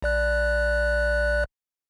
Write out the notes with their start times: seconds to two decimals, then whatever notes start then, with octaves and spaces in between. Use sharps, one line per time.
0.02 A#1 D5 F#6